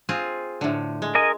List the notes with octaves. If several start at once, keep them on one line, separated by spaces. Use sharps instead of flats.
C4 F4 G#4
A2 D3
G#3
A#4 D#5 G#5